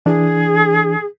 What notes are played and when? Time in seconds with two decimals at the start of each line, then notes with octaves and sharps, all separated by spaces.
0.06 E3 D4 G#4